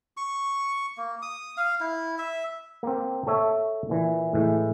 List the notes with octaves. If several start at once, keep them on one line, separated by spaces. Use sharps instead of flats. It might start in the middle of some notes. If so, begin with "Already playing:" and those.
C#6
A#3
D#6
F5
E4
E5
A#3 C4
A4 C#5 E5
A#2 E3
A2 E3 G#3